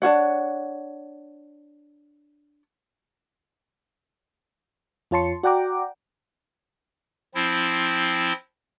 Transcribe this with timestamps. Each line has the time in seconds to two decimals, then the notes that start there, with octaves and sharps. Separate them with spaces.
0.02 D4 F#4 C#5 F#5
5.11 F2 F4 C#5 A5 C6 C#7
5.43 F#4 D5 F#5 G5 A#5 D6
7.35 F3 C4 E4